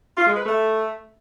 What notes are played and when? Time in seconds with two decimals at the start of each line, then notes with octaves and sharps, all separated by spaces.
0.17 F4
0.27 G#3
0.36 B4
0.46 A3